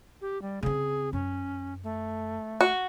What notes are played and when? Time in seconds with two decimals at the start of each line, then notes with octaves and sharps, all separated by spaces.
0.21 G4
0.42 G3
0.63 C#3 C4 G#4
1.13 F#2 C#4
1.84 A3
2.61 F#4